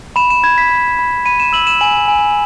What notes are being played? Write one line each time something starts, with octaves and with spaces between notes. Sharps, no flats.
B5 E7
E7
B5 G#6
B6
B5
B5
B5 D#7
E7
E6 F#7
E7
G#5 F#7
G#5